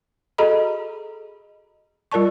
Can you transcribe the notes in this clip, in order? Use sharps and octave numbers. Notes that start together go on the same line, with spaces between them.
F#4 G#4 A4 D#5 A#5 B5
G3 F4 A#4 D5 A5 C#6